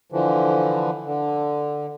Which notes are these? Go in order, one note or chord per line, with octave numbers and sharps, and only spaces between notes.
D3 E3 F3
D3